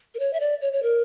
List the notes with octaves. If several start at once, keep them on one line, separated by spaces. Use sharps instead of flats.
A#4
C#5
E5
D5
C#5
C#5
A#4